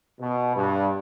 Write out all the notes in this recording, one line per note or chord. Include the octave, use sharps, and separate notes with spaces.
B2
G2